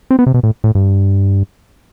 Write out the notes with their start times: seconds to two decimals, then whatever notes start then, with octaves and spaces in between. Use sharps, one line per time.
0.11 C4
0.19 B3
0.26 C3
0.34 B2
0.43 A2
0.64 A2
0.75 G2